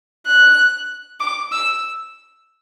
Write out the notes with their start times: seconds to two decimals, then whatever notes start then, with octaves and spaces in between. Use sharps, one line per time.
0.26 F#6
1.20 D6
1.52 E6